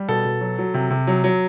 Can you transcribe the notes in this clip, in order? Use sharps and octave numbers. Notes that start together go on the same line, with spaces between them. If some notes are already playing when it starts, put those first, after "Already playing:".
Already playing: G3
B2 A4
B2
F#3
F#3
C3
C3
F#3
F#3